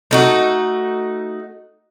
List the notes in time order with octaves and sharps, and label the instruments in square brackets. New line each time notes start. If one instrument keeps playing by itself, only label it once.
[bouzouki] A3 D#4 F#4